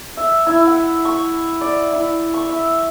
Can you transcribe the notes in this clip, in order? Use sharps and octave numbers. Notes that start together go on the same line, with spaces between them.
E5
E4
F#5
C#6
D5
E4
C#6
E5